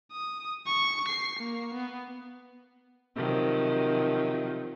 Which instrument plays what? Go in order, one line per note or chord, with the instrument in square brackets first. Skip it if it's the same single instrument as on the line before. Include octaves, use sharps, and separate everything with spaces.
[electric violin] D#6
C#6
C7
A#3
B3
[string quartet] C3 D#3 F3 F#3